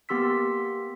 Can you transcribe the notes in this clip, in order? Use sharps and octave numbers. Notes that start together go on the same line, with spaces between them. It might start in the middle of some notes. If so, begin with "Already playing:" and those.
A#3 B3 G4 C6 E6 B6